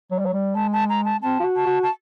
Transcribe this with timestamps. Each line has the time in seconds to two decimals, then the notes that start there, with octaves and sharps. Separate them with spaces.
0.11 F#3
0.19 G3
0.25 F#3
0.33 G3
0.55 G#3 A5
0.73 A5
0.89 A#5
1.05 A5
1.22 C4 A5
1.40 F4
1.44 F#4
1.56 A5
1.66 F#4
1.83 A5